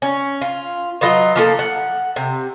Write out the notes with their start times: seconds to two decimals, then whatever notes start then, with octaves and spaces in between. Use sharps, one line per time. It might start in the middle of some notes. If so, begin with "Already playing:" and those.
0.02 C#4
0.41 F4
1.01 F#3 D#4 F4 B4
1.36 F3 A#3 A4
1.59 F#5
2.16 C3